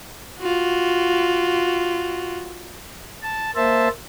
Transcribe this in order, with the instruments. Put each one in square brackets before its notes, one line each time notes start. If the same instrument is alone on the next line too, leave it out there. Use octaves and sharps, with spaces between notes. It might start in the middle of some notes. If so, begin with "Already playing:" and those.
[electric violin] F4 F#4
[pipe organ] A5
A#3 C5 E5 A5